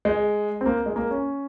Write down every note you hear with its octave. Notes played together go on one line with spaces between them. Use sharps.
G#3
C4
A#3
G#3
A#3
C#4